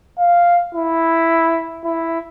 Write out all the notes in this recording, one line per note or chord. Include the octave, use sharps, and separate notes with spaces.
F5
E4
E4